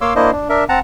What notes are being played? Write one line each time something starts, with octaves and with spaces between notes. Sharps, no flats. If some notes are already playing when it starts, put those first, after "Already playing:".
A#3 C#5 F5 C6 D6 E6
A#3 D4 E4 C5 D#5
D4
D4 A#4 E5
C4 F#5 A5 A#5